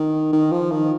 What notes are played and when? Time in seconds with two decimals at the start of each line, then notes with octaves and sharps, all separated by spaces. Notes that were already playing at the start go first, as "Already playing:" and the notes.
Already playing: D#3
0.33 D#3
0.52 F3
0.71 D#3